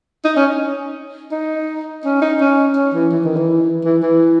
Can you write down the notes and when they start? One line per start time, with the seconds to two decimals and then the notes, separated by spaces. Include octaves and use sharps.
0.25 D#4
0.37 C#4
1.31 D#4
2.05 C#4
2.22 D#4
2.41 C#4
2.76 C#4
2.94 E3
3.12 E3
3.25 D#3
3.36 E3
3.85 E3
4.02 E3